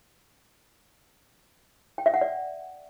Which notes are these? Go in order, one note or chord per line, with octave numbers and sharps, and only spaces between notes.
G5
E5
F#5
D5